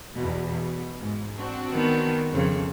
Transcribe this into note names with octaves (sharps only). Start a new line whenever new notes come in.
E2 B2
B2
G#2
C4 D4 F#4
D#3 B3
F2 C#3